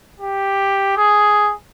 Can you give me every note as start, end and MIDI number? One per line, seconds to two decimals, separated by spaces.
0.20 0.94 67
0.97 1.53 68